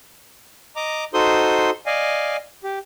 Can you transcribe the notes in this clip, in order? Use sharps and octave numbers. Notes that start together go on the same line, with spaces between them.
D#5 A#5 D6
D#4 F#4 A4 C5 C6 D#6
D5 D#5 F5 G#5
G4